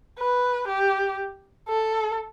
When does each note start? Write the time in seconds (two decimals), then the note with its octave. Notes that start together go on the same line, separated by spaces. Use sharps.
0.19 B4
0.68 G4
1.68 A4